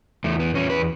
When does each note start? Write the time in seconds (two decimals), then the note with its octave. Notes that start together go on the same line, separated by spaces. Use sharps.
0.24 E2 A3
0.39 B3
0.54 E2 C#4
0.70 B4